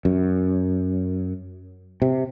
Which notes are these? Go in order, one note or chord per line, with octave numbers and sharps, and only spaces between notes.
F#2
C3